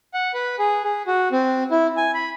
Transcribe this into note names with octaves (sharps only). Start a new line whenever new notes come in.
F#5
B4
G#4
G#4
F#4
C4
E4
G#5
B5